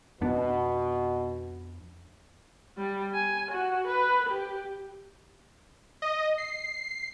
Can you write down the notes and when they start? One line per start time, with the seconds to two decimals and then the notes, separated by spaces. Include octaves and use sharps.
0.21 F2 B2 B3 D4
2.78 G3
3.15 G#5
3.51 F#4
3.87 B4
4.29 G4
6.02 D#5
6.38 C7